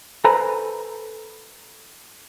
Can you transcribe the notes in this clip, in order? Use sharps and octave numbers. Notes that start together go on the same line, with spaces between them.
A4 B4 C5 G#5 A#5 B5